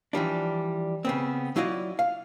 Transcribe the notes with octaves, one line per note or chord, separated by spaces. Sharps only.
E3 F3 G3 D4
C#3 B3 C4
F#3 E4 F4 D5 D#5
F5